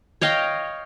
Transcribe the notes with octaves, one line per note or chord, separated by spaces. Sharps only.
C#5 D#5 F5 G5